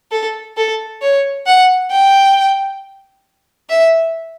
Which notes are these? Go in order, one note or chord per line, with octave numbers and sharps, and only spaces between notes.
A4
A4
C#5
F#5
G5
E5